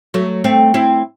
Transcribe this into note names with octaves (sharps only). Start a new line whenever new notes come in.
F#3 A3
A3 C4
C4 E4